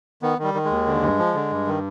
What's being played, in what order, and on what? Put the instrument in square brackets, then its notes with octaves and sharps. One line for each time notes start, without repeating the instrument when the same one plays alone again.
[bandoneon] D#3 B3
D#3 G3
D#3
G#3
D#2
D3
G2
F3
D3
G2
D#3